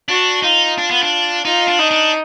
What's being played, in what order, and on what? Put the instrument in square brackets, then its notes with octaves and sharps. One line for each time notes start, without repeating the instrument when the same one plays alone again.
[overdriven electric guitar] D4 [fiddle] F#4
[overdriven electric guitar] D#4 [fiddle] F4
[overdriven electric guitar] D4
B3
D4
[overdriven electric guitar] D#4 [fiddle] F4
[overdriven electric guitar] D4
[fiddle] D#4
[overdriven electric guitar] D4